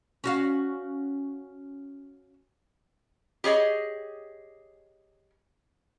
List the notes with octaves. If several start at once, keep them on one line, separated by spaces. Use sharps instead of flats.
C#4 F#4 F5
G4 G#4 C#5 D#5